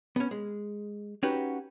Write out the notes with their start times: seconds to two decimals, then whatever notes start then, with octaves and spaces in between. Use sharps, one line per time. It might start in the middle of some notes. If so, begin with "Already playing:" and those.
0.16 B3 C#4
0.31 G#3
1.23 C#4 D#4 F#4 G4 B4